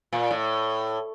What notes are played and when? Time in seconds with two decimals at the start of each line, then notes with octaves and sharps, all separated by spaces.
0.13 A#2
0.31 A2